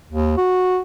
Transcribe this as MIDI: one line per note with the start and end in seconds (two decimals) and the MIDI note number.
0.10 0.37 39
0.37 0.80 66